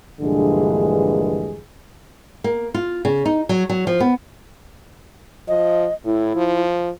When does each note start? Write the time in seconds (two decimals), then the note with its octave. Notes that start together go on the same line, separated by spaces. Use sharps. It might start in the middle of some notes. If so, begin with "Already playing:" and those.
0.20 A#1 G2 D3 E3 G#3 G#4
2.44 A#3
2.74 F4
3.05 C#3
3.25 D#4
3.49 F#3
3.69 F#3
3.87 F3
4.00 B3
5.48 F3 D#5
6.05 A2 E4
6.36 F3